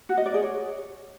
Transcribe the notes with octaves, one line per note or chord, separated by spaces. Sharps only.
F#4
D#5
D5
G#4
C#5